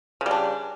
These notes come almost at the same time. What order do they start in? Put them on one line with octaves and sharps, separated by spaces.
C#3 G3 D4